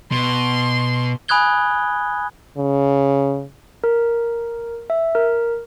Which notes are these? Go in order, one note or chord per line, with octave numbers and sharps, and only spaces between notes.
B2 C6
G#5 B5 D#6 F#6 G#6 G7
C#3
A#4
E5
A#4